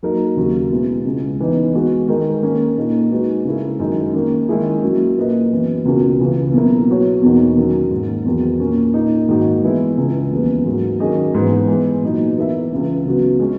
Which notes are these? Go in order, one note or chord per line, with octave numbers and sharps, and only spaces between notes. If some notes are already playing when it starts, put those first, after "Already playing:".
F#3 A#3 D#4 A#4
D#2 C#3 F#3 A#3
B2 G#3 B3 E4
C#2 C#3 G#3
E3 B3 D#4
G#3 B3 F#4
D#3 G#3 D#4 A#4
D#3 A#3 C#4
A#2 A#3 D#4 A#4
G#3 D#4 F#4 B4
C#3 G#3 C#4 E4 A#4
F#2 D#3 G#3 D#4 A#4
D#3 A#3 C#4
D#3 G#3 C#4 E4 G#4
F#3 A#3 C#4 F#4
A#2 A#3 E4 B4 D#5
F#2 E3 B3
C#2 B2 A#3 C#4 F#4
C#2 C#3 E3
B2 F#3 A#3 E4 A#4
F#3 B3 F#4 C#5
E2 B2 A#3 D#4 F#4
D#3 F#3 C#4
G#2 D#3 A#3
E2 D#3 F#3 B3
A#2 A#3 C#4
A#2 A#3 D#4
G#2 D#3 A#3 D#4 F#4
E3 G#3 B3 E4
C#2 C#3 G#3
D#2 C#3 E3 G#3 B3
G#2 F#3 A#3
D#3 F#3 C#4 G#4 D#5
G#2 E3 B3
E3 G#3 B3
A#2 F#3 B3 D#4
E3 B3 E4 A#4 E5
C#2 C#3 E3
C#3 F#3 B3 F#4
G#3 C#4 G#4